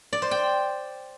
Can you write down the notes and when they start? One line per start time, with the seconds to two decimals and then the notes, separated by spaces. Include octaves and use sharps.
0.13 D5
0.22 C5
0.31 G5